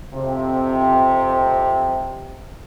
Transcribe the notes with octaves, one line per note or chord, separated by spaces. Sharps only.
F2 C3